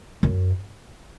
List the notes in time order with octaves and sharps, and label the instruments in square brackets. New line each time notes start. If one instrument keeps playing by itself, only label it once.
[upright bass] F#2